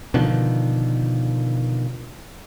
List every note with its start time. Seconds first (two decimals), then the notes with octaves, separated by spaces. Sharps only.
0.14 B2 D3 D#3 F3